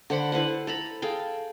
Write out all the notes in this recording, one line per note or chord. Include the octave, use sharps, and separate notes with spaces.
D3 C5 F#5 B5
E4 B4 C5 F#5
A4 A#5 B5
G#4 A4 F5 G5